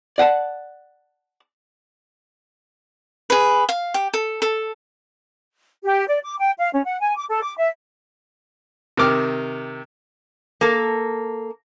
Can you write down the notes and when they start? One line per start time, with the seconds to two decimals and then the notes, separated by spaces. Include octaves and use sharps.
0.18 D5 F#5 G5 A5
3.30 G#4 B4
3.69 F5
3.94 G4
4.14 A4
4.42 A4
5.84 G4
6.07 D5
6.24 D6
6.39 G5
6.58 F5
6.74 C#4
6.85 F#5
7.00 G#5
7.16 D6
7.29 A4
7.43 D6
7.58 E5
8.97 C3 D#3 D6 F6
10.61 A#3 A4